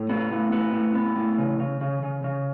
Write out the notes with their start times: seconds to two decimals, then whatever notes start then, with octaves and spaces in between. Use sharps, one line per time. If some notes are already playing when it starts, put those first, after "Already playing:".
Already playing: A2
0.09 B3
0.31 A2
0.52 B3
0.74 A2
0.95 B3
1.17 A2
1.38 C#3
1.59 C#3
1.81 C#3
2.03 C#3
2.24 C#3